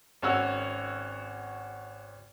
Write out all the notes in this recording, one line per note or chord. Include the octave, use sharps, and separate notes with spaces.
G#1 C#4 F#4 E6